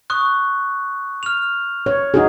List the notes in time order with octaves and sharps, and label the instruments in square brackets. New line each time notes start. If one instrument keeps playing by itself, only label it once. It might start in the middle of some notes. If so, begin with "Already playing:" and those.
[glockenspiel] C#6 D#6 F#6
F6 F7
[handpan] C#5
D#4 F#4 G#4